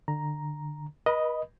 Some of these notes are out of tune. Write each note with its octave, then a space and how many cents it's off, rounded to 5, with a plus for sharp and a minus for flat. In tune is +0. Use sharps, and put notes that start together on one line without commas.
D3 +25 A#5 +5
B4 -40 D#5 +0 B5 +0